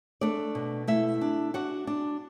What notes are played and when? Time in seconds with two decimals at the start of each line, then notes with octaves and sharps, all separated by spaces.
0.21 A3 D4 D5
0.55 B2
0.88 A3 E4 E5
1.21 D4
1.54 D4 F#4 F#5
1.87 D4